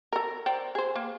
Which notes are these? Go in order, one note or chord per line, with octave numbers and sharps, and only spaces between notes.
A4 A#4
C5 D5 G5
G#4 C5
A#3